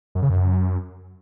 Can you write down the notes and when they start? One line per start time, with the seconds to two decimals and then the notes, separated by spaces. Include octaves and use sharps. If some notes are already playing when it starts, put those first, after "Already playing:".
0.15 F#2
0.22 C#3
0.30 F#2